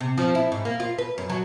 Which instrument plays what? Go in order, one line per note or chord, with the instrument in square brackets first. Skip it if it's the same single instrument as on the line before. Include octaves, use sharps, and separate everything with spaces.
[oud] C3
F3
E4
G#2
A#3
F4
B4
F#2
F#3